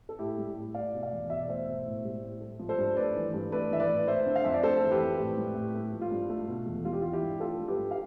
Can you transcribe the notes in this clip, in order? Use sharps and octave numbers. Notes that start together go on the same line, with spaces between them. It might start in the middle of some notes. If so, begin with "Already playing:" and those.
A4
A2 E4 G4
G3
A2
A3 D5 F5
B2
D5 F5
E2
B2 E5
D5
A3 C5 E5
B2
A2
G3
A2
A3
F3
A4 C5
G2
A3 B4 D5
E3
G2
A3 B4 D5
E3 E5
B4 D5
A2
A3 C5 E5
D3
F5
F2 E5
D5
A3 A4 C5
E3
G4 B4
F2
A2
G3
A2
A3
F3
F4
G2
A3
B2
E2
G3 F4
G4
E3 F4
E4 G4
G2
A3 F4 A4
F3
G4 B4
G2
F5